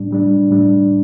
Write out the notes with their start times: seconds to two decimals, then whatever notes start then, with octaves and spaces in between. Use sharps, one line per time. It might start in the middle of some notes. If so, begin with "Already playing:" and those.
Already playing: A2 G3 D4
0.11 A2 G3 D4
0.50 A2 G3 D4